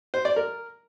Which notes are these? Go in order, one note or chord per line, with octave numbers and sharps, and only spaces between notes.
C5
D5
A#4